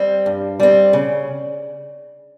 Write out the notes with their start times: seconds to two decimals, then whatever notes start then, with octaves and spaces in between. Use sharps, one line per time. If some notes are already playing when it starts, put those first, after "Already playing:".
Already playing: G3 C4
0.26 G2
0.60 G3 C4
0.93 C#3